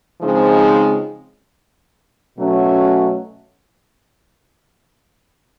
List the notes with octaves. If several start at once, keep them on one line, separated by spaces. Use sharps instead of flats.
C#3 F3 G#3 C4 D#4
B2 F#3 A3 C#4